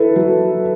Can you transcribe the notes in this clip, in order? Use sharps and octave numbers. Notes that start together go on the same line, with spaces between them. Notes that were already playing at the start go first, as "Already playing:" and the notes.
Already playing: E4 A4 B4
F#3